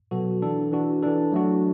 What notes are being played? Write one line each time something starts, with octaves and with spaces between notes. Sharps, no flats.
B2 F#3 B3 F#4 A4
E3 D4 A4
E3 D4 F#4
E3 D4 A4
F#3 A3 D4 F#4